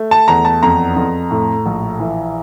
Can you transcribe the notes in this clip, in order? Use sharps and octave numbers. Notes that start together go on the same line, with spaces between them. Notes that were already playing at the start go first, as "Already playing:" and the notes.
Already playing: A3
A5
E2 A#5
A5
F2 A#5
F2
A2
A#1
E3